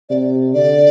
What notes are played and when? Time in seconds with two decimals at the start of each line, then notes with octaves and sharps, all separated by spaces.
0.09 C3 D5
0.54 D3 D5